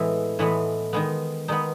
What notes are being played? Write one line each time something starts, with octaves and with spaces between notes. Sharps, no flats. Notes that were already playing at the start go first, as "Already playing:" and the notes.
Already playing: A2 E3 G#3 B3 E4
A2 E3 G#3 B3
D#3 G#3 B3
D#3 G#3 B3 D#4